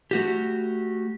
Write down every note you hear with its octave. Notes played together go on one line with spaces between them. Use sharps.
A3 F#4 G4